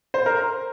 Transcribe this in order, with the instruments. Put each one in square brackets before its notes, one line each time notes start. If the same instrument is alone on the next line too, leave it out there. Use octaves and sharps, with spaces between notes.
[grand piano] C5
A#4